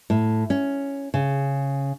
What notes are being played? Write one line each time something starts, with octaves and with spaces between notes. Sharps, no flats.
A2
C#4
C#3